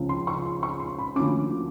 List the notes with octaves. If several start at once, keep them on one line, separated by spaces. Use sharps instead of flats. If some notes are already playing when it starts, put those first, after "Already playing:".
Already playing: C#2 C#3 F3
C6
C#6
C6
C#6
C6
B5
D2 D3 F3 A#3 C#4 D6